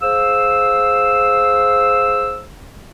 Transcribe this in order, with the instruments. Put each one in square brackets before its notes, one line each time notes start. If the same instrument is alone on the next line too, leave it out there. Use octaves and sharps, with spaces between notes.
[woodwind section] G#4 C5 F5 E6